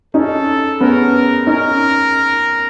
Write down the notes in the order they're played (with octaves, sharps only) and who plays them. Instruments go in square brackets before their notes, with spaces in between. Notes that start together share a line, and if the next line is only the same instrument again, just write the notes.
[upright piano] C#4 D#4 [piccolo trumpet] A4
[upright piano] B3 C#4 [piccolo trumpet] A#4
[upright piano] C#4 D#4 [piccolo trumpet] A#4